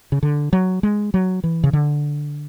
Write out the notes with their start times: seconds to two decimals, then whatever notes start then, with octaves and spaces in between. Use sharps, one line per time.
0.12 C#3
0.23 D3
0.53 F#3
0.83 G#3
1.14 F#3
1.44 E3
1.63 C#3
1.73 D3